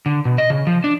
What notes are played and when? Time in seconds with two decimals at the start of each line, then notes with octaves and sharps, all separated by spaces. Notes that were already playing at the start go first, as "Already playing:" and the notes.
0.06 D3
0.25 B2
0.38 D#5
0.50 C#3
0.67 F3
0.84 D4